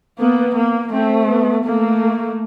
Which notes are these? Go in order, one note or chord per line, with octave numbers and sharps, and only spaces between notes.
A#3 B3
A#3
A3 C4
B3
A3 A#3